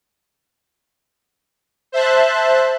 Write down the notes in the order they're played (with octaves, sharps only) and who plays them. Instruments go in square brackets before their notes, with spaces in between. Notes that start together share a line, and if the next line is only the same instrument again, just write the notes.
[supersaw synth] C5 E5 A5 F#6